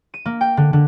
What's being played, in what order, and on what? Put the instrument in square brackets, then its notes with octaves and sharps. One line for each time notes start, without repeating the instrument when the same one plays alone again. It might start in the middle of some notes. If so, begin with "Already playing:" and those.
[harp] D#7
A#3
G5
D3
D3